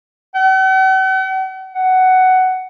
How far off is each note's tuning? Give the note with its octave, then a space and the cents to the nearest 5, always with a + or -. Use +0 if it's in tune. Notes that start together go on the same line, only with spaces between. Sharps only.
F#5 +45
F#5 +10